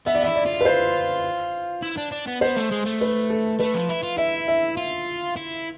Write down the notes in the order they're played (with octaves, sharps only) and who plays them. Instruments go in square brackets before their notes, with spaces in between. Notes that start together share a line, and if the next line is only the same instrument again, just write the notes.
[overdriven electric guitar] B3 [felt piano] E5
[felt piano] D5
[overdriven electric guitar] E4 [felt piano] E5
[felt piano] D5
[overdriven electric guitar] F4
[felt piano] B4
C5
[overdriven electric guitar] E4
D4
D4
B3
[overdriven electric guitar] B3 [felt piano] C5
[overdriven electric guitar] A3
G#3
A3
[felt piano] B4
A4
[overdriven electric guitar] A3 [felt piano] B4
[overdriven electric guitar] F3
E4
F4
[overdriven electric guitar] E4 [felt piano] E5
[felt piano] E5
[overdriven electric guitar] F4
E4